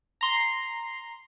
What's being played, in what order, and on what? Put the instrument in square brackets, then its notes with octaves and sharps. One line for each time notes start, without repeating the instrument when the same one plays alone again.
[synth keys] A#5 C6